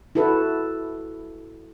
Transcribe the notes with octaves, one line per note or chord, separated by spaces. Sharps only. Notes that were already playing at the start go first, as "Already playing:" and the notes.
E4 F#4 A4 B4